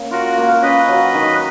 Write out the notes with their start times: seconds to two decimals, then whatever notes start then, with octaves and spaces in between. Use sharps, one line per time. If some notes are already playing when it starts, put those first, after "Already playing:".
Already playing: A#3 C#4
0.11 F4 F#4 A#4
0.38 A#3
0.63 C#4 B4 D#5
0.89 F#3
1.14 D#3